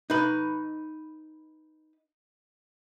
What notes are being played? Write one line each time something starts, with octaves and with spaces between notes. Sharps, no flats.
D#4 B4